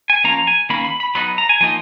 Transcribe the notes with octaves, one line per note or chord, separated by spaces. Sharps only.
G#5
F3 A#3 C#4 A#5
G#5
D#3 A#3 C#4 B5
B5
B5
F#3 B3 D#4 B5
A#5
G#5
F3 A#3 D#4 G#5